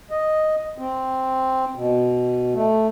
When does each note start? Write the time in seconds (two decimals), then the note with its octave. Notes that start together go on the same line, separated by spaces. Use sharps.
0.11 D#5
0.78 C4
1.76 B2
2.54 A3